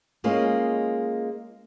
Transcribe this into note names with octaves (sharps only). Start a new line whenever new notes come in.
G#3 A#3 C#4 F4 D#5